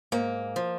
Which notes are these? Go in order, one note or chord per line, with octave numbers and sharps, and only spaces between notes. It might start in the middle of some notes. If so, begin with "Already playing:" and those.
G#2 A#3
F3